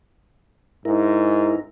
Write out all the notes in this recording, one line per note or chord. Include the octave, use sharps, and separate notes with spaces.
G#2 E4 A#4